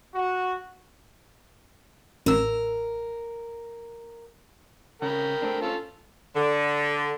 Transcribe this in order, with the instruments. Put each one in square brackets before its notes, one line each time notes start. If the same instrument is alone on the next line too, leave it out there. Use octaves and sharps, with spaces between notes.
[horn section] F#4
[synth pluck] A1 E6 [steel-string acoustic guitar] A#4
[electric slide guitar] C#3 C#4 [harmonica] A#4 G5 B5
[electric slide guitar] A3 C4 D4
[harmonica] C#4 F4 A4
[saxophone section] D3